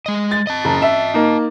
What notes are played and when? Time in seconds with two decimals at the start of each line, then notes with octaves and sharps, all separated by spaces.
0.06 G#3 D#5
0.31 A6
0.47 D#5 A5
0.64 F#1 A#5
0.82 E5
1.14 A#3 D#4